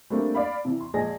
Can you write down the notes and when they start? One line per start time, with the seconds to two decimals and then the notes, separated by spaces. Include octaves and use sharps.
0.10 G3 A3 A#3 C4 D4
0.35 D5 F5 B5
0.65 C3 E3
0.80 C6
0.94 A#1 G#3 G#4 A#6